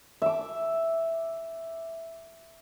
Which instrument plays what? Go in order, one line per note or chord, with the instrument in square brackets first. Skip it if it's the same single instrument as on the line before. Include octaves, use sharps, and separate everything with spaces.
[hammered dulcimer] E5 D6